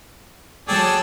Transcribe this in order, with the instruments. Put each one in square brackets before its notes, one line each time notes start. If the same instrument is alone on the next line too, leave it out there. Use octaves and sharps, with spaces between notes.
[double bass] F#3 [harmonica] G#4 A4 D5 [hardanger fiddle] G5 A5